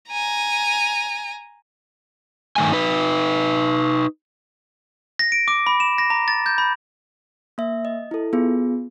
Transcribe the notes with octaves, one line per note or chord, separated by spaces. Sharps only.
G#5 A#5
G2 D#3 A3 G#5
D#4 B4
A#6
D7
D6
B5
E7
A#6
A#5
A6
G6
B5
A#3 E5
D#5
E4 A4
B3 F4 G#4